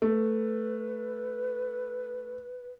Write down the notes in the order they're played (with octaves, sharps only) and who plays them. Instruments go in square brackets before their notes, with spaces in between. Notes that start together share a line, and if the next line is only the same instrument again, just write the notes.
[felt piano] A3 [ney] B4